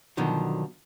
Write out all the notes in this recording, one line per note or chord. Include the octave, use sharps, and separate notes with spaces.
B2 D3 D#3 F3 F#3